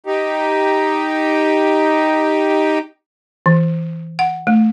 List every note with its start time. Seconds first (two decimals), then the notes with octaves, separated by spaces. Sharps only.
0.06 D#4 G4
3.46 E3
4.19 F#5
4.47 A3